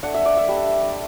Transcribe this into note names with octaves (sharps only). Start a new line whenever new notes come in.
A3 D4 F#5
E5
D5
E5
G3 D4